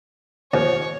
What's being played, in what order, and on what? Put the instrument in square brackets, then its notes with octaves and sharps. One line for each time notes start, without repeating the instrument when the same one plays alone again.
[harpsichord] D#2 F3 [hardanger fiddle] C#5